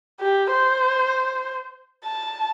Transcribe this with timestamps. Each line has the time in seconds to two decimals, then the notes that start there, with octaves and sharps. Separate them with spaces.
0.20 G4
0.52 C5
2.04 A5